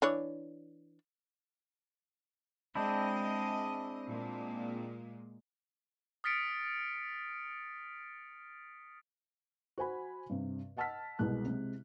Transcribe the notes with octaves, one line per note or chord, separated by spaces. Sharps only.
E3 D4 C#5
G#3 C4 D4 E4 D#5
A#2 G#3
D#6 F6 A6 B6 C#7 D7
F#4 C5 G#5 B5
G2 C3
D#5 F#5 A5 E6 F6 B6
C2 B2 G#3 F#6
C3 G#3